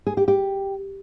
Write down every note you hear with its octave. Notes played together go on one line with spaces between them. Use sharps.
G#4
G4
G4